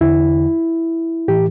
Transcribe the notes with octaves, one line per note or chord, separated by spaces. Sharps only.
E2 D3 E4
A2 E3 G4